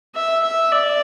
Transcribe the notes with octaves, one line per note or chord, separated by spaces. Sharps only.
E5
E5
D5